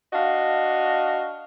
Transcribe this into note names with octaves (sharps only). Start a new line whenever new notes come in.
D4 F#4 D#5 F5